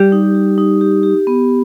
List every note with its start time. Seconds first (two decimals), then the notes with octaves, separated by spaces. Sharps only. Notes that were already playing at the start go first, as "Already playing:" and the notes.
Already playing: G3 G4
0.12 D#4
0.35 G4
0.58 D#4
0.81 G4
1.03 G4
1.27 B3